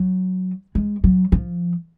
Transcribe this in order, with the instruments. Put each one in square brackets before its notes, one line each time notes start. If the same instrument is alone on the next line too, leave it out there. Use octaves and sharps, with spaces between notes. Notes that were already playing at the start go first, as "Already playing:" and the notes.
Already playing: [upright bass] F#3
G#3
F#3
F3